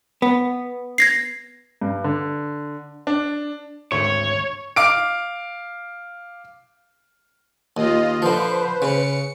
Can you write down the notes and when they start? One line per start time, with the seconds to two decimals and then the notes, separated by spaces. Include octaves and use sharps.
0.22 B3
0.98 G#6 A#6 C7
1.81 G2
2.04 D3
3.07 D4
3.92 G#1 D2 A3 C#5 C#6
4.76 F5 D6 D7
7.77 D#2 F4 D#5
8.22 D3 F3 B4 C5
8.82 C#3 C#7